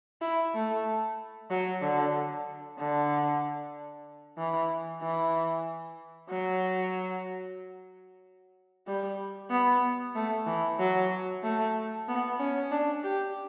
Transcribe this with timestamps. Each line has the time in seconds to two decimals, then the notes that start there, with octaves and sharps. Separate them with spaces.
0.21 E4
0.54 A3
1.50 F#3
1.82 D3
2.79 D3
4.38 E3
5.02 E3
6.31 F#3
8.87 G3
9.51 B3
10.16 A3
10.47 E3
10.79 F#3
11.43 A3
12.08 B3
12.40 C#4
12.72 D4
13.04 G4